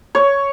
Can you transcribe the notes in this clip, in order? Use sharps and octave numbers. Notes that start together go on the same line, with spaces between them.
C#5